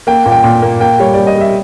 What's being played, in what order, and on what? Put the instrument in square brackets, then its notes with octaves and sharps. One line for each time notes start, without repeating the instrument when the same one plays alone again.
[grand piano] A#3 G5
A#2
G5
A#2
A#3
A#3 G5
G3 C#5
G3 D5
D#5
G3
E5